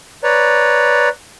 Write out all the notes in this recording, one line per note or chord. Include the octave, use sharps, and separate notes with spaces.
B4 C#5 D5 A#5